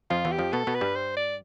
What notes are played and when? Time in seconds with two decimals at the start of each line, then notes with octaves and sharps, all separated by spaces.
0.10 F2 F3 F4
0.25 E2 E3
0.32 G4
0.38 F2 F3
0.53 B2 B3 A4
0.67 B2 B3
0.74 B4
0.81 G2 G3
0.96 C5
1.17 D5